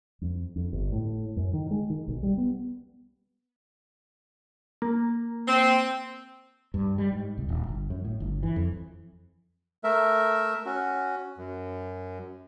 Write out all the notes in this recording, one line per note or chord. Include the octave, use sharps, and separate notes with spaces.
F2
F2
G1
A2
F#2
D#3
G#3
D#3
B1
G3
B3
A#3
C4
G2
G3
G#2
C2
D#1
G1
F#2
A2
G1
E3
F2
A3 A#4 E5
C#4 F#4
F#2